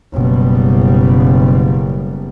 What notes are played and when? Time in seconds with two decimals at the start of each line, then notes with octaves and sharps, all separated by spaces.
0.14 F#1 B2 G3